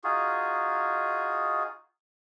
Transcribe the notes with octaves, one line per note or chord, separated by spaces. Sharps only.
D#4 F4 F#4 G#4